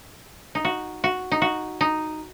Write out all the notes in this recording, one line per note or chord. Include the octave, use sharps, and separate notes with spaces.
D#4
F#4
F#4
D#4
F#4
D#4